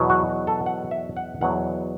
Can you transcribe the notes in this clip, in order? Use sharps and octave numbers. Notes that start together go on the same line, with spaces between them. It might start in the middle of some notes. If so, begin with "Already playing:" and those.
Already playing: E2 B2 F#3
F#4
A4
F#5
E5
F#5
E2 B2 F#3 F#5